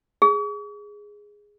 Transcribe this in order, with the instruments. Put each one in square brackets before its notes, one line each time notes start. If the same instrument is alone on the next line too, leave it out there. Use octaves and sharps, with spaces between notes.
[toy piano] G#4